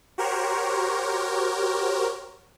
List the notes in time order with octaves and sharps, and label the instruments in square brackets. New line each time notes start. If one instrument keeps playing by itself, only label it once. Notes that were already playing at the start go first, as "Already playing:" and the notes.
[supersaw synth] F#4 G4 A#4 C5 C#5